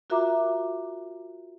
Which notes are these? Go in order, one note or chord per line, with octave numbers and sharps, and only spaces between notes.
F4 F#4 A#4 E5 A#5 D6